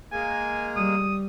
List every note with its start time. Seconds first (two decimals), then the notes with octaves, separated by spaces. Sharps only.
0.12 G#3 A#3 G#5
0.76 G3 D#6